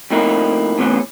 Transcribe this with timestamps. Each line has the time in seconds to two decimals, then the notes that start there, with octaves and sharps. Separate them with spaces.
0.10 F2 A2 D3 A#3 D#4 E4
0.78 E2 A2 C3 D#3 E3 C#4